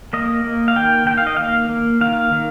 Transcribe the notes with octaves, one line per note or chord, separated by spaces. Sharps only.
A#3 D#5
A#3
F5
D#3 G5
D#3 G5
F5
D#5
A#3 F5
A#3
D#3 F5
D#3